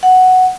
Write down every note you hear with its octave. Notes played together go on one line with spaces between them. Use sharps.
F#5